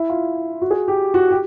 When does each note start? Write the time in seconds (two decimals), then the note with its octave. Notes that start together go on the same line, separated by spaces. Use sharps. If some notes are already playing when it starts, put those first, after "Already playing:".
Already playing: E4
0.09 F4
0.62 F#4
0.71 G#4
0.88 G4
1.14 F#4
1.31 G4